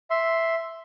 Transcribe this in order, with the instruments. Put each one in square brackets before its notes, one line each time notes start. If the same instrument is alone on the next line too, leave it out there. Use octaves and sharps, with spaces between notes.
[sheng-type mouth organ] E5 C6